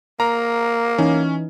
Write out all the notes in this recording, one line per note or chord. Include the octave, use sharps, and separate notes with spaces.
A#3 A#5
E3 C#4 D#4